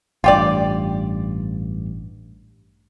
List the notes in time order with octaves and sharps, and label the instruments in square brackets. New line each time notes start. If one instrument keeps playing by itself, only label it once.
[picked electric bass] A1 G2 [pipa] F4 G4 D5